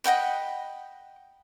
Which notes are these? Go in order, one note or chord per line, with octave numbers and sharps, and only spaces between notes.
D#5 F#5 G5 B5